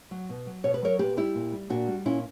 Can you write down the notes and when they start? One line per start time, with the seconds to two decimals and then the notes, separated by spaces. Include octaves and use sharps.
0.11 F#3
0.29 B2
0.47 F#3
0.64 B2 C#5
0.74 B4
0.82 F#3 A#4 C#5
0.99 A#2 G4 B4
1.17 G3 E4 G4
1.35 A#2
1.52 G3
1.70 A#2 D4 F#4
1.87 G3
2.05 A#2 C#4 E4